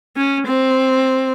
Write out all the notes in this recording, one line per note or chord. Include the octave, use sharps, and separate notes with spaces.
C#4
C4